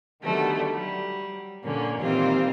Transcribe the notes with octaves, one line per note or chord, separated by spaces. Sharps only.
D3 D#3 F#3 G3 A3 B3
F#3 G3
A#2 D3 A#3 C#4
A#2 D#3 E3 G3 C4 F4